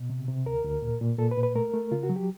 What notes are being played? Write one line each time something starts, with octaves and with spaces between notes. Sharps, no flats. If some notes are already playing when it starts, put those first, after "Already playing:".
Already playing: B2
C3
C3
D2 A#4
D2
A#2
A#2
A#2 A4
B4
A#2
B4
A3 A#4
A3
C#3 F4
F#4
F#3
G4